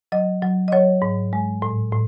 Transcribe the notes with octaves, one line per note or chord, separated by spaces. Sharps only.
F#3 D#5
F#3
D#5
F#3 C#5
G#2
G#3
A2
A2